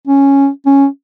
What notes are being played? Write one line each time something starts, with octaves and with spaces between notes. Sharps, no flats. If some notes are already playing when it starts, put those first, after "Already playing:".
C#4
C#4